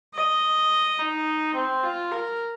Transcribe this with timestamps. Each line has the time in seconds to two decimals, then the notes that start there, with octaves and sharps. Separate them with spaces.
0.15 D#5
0.99 D#4
1.55 C4
1.83 F4
2.12 A#4